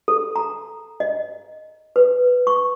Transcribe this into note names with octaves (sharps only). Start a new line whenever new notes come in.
A4
A#5
D#5
B4
C#6